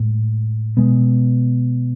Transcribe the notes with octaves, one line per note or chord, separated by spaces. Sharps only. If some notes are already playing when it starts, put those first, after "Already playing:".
Already playing: A2 G#3
B2 G#3 B3